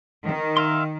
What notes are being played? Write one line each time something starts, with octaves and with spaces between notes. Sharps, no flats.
D#3
E5 F5 C6